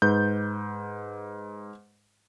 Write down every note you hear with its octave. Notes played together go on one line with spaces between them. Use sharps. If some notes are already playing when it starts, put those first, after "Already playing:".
G#2 B4 G6